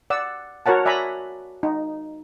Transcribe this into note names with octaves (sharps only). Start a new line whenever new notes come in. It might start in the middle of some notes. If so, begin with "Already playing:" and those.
D5 F#5 E6
F#4 A#4 C#5 F#5 A5
D5 E5 G#5 A#5 B5
D#4